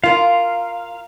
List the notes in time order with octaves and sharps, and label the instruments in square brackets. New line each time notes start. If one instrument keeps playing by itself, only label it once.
[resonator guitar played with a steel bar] F4 A#4 [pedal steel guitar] F5